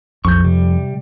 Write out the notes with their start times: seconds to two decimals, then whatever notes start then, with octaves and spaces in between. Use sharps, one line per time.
0.25 B1 F2 C#6 G6
0.44 C3 G3